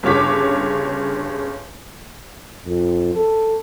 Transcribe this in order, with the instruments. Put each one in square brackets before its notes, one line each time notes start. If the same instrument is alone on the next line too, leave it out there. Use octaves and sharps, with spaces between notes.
[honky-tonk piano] G1 G2 C#3 C#5 D6 B6
[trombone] F2
A4